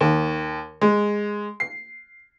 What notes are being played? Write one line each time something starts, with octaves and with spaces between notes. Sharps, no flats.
D#2
G#3
C7